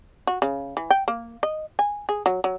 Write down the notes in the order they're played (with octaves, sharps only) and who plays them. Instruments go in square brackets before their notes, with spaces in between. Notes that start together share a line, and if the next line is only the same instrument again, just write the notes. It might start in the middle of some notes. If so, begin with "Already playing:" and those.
[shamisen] F#4
C#3
E3
G5
A#3
D#5
G#5
G#4
F#3
F#3